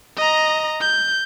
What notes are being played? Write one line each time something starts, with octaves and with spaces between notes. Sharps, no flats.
D#5 A#5
G6